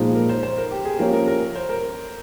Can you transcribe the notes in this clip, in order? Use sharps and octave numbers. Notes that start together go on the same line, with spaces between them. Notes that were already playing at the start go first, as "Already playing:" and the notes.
Already playing: A#2 F3 G#3 D#4
A#4
C5
C5
A#4
G4
G#4
F3 A#3 C#4 G4 A#4
A#4
A#4
C5
A#4